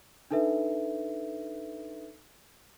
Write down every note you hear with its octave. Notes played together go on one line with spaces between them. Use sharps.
D4 D#4 A4 B4 E5